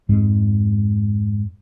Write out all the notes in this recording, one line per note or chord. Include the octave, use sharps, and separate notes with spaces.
F2 G#2 G#3